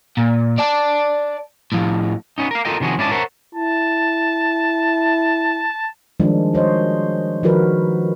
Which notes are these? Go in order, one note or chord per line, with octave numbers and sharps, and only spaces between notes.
A#2
D5 A5
A2 F3
B3 C#4 D#4
A#4 F5
F4 A4 A#4 D#5 G5
C3 D#3 F3 F#4 G#4
G#2 C#4 E4 D5 D#5 A5
A#4 C5 C#5 E5 F#5 A5
E4 A5
D#3 F3 G3 G#3 D4
F#4 C5 C#5 D#5
D#3 F3 F#4 A#4 B4